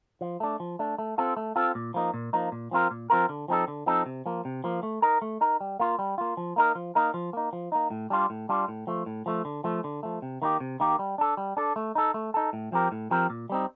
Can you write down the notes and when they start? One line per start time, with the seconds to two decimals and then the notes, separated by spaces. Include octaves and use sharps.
0.21 F3
0.40 A3 D4
0.60 F3
0.79 A3 D4
0.98 A3
1.18 C4 F4 A4
1.37 A3
1.56 C4 F4 A4
1.75 A#2
1.94 F3 A#3 D#4
2.14 A#2
2.33 F3 A#3 D#4
2.52 A#2
2.71 F3 C4 F4 A#4
2.91 A#2
3.10 F3 C4 F4 A#4
3.29 D3
3.48 F3 C4 D#4 A4
3.68 D3
3.86 F3 C4 D#4 A4
4.06 C3
4.26 F3 A#3
4.45 C3
4.64 F3 A#3
4.83 A3
5.02 D#4 A#4
5.22 A3
5.41 D#4 A#4
5.61 G3
5.80 A#3 F4
5.99 G3
6.18 A#3 F4
6.37 F3
6.56 A#3 D#4 A#4
6.75 F3
6.95 A#3 D#4 A#4
7.14 F3
7.33 A#3 D#4
7.53 F3
7.72 A#3 D#4
7.91 A2
8.10 G3 D4 F4
8.30 A2
8.49 G3 D4 F4
8.68 A2
8.87 F3 A3
9.06 A2
9.26 F3 A3
9.45 D3
9.64 F3 A3
9.84 D3
10.03 F3 A3
10.22 C3
10.42 D#3 A#3 D#4 G4
10.60 C3
10.80 D#3 A#3 D#4 G4
10.99 G3
11.18 D4 A4
11.37 G3
11.57 D4 A4
11.76 A3
11.95 D#4 A4
12.14 A3
12.34 D#4 A4
12.53 A2
12.72 F3 C4 G4 A#4
12.92 A2
13.11 F3 C4 G4 A#4
13.30 A#2
13.50 G3 C4 D#4